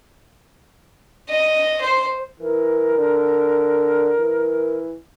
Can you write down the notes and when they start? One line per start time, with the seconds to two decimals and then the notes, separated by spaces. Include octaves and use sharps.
1.29 D#5
1.81 C5
2.39 E3 A#4
2.95 D3
4.17 E3